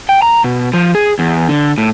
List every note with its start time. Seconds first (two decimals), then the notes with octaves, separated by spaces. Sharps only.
0.09 G5
0.22 A#5
0.44 B2
0.74 F3
0.95 G#4
1.19 E2
1.49 D3
1.78 A2